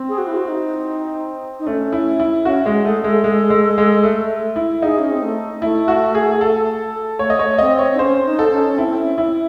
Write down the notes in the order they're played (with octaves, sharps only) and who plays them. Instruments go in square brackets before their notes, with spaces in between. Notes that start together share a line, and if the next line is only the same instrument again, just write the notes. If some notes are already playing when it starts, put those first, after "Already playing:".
Already playing: [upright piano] C4
[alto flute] G#4
F#4
E4
F#4
D#4
D#4
[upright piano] A3 [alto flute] C#4
[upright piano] E4
E4
[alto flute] C#4 [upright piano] F#4
[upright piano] G#3
[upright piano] A3 [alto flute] G#4
[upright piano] G#3 [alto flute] A4
[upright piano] G#3
G#3
G#3
A3
E4
[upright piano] D#4 [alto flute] G#4
[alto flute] C#4
C4
A3
[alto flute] A3 [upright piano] E4
[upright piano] F#4
G#4
A4
[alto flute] A3 [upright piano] C#5
[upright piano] D#5
C#5
[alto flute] A3
[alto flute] C4 [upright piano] D#5
[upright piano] C#5
[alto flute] D#4
[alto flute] C#4 [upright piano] C5
[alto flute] D#4
[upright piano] A4
[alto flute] C#4
C#4
[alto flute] C4 [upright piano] E4
[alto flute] C4
C#4
[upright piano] E4